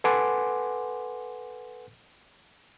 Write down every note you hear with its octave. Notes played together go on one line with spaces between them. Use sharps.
A4 B4 F#5 G#5 C6 D6